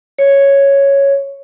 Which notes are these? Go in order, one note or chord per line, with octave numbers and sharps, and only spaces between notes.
C#5